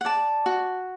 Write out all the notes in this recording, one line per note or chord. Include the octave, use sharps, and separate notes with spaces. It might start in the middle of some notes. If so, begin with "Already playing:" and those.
F#5
D5 A5
F#4